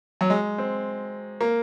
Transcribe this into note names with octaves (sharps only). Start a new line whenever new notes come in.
F#3
G#3
C4
A#3